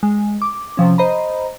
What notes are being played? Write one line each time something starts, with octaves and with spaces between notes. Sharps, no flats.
G#3
D6
C3 F3 C#4
C5 D#5 A#5 B5